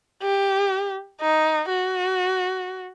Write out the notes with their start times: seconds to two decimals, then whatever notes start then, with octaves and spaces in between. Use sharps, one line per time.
0.23 G4
1.22 D#4
1.69 F#4